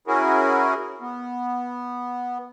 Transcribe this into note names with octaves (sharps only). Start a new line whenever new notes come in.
C#4 E4 F#4 G#4 A#4
B3